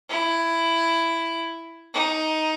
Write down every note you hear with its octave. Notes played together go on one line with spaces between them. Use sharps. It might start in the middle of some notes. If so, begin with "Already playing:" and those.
E4
D#4